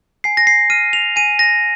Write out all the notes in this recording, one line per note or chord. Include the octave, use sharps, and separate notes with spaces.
G#5 C7
A#6
C7
F6 D#7
F7
G#5 D#7
A#6